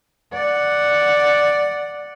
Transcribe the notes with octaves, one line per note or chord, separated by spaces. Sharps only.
D5 F#5